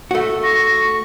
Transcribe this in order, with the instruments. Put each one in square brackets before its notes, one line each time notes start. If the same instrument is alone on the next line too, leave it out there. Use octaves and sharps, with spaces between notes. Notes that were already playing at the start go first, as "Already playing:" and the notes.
[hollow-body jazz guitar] A3 F#4
[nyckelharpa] C#6 [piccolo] A#6